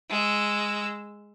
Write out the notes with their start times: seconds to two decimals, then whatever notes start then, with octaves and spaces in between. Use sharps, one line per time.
0.10 G#3 E6